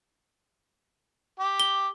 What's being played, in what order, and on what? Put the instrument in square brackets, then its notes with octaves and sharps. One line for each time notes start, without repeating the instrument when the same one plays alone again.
[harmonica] G4
[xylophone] G7